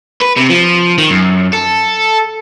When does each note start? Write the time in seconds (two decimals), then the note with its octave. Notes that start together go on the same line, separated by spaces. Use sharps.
0.21 B4
0.36 C3
0.49 F3
0.98 D#3
1.10 F#2
1.53 A4